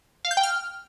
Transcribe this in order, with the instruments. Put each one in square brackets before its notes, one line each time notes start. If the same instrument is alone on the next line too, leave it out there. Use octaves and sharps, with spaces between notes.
[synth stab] F5
G6
G5
F6